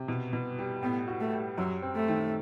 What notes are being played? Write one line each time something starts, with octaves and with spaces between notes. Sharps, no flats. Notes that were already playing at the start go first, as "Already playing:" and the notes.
Already playing: C3
B2
B2
G3
A2 B3
F#4
A3
G3
F#2 F#3
C4
A3
D#3